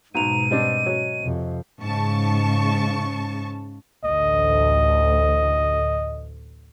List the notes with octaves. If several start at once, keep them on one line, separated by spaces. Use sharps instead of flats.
B1 G#2 B2 D#4 A#5 D#7 F7
G3 C4 D4 D#5
F#3 C#4
F2 C3
G#2 C#3 A5 C#6
A1 D2 D#5